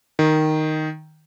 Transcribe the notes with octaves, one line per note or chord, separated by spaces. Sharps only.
D#3